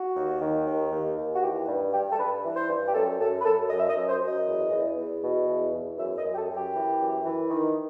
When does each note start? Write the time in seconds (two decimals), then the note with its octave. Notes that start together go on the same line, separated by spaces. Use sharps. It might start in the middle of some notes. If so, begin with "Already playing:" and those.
Already playing: F#4
0.16 D#2
0.42 D#3
0.67 D#2
0.92 D#2
1.17 D#2
1.35 F#4
1.42 E3 G4
1.67 G2
1.93 G2 G4
2.12 A4
2.19 G2 B4
2.44 E3
2.56 C5
2.69 G2
2.87 G4
2.94 F#2 A4
3.20 F#2 A4
3.41 B4
3.45 F#2 A4
3.70 F#2 D#5
3.80 E5
3.89 D#5
3.96 F#2
4.09 C5
4.21 F#2
4.28 D#5
4.46 E2
4.71 E2
4.97 E2
5.23 B2
5.47 E2
5.74 E2
5.98 F#2 E5
6.18 D#5
6.24 F#2
6.32 G4
6.37 A4
6.49 F#2
6.56 G4
6.74 E3
7.00 F#2
7.25 E3
7.50 D#3